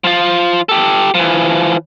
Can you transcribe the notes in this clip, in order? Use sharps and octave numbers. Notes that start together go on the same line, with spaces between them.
F3 F4
G4 A4
E3 F3